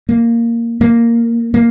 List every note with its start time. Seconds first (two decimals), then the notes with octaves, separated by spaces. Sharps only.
0.09 A#3
0.81 A#3
1.54 A#3